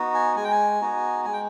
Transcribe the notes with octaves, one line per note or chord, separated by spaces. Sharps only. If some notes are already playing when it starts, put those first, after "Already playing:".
Already playing: B3 D#4 F#4
G#5
G#3 G#5
G5
G#5
B3 D#4 F#4
G#3 G#5
G5